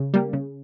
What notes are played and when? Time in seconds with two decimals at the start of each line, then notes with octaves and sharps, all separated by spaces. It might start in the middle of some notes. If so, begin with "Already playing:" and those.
Already playing: C#3
0.14 G3 A#3
0.33 C#3